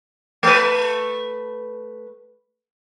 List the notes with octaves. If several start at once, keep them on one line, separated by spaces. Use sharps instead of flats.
A3 B4